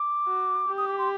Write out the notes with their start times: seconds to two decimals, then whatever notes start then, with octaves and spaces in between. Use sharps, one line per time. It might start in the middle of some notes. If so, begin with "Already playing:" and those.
Already playing: D6
0.27 F#4
0.68 G4
0.77 D#6
0.88 D6
0.98 C6